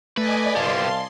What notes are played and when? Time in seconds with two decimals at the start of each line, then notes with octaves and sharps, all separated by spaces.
0.18 A3 B4 D5 D#5 G#5
0.56 C2 B3 G4 F5 A5 C6